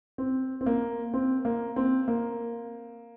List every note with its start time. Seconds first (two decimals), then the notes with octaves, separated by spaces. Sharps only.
0.18 C4
0.61 C4
0.66 A#3
1.14 C4
1.45 A#3
1.76 C4
2.08 A#3